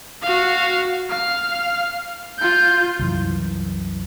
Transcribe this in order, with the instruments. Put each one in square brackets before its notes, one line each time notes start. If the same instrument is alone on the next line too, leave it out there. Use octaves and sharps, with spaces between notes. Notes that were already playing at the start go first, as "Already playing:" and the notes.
[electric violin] F#4 F5
F5 F6
F4 G6
[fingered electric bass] C2 F#2 E3